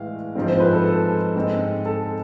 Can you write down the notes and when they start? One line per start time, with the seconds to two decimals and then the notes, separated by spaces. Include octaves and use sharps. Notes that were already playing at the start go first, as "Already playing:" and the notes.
Already playing: A2 E3 G#3 F5
0.35 G#2 F3 G#3 C4
0.48 C5
0.60 B4
0.73 A4
0.86 A4
1.35 G#2 G#3 C4
1.86 A4